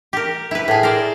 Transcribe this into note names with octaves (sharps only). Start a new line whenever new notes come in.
G4 A#4
E4 B4
A2 G#4
A#4 C5 D5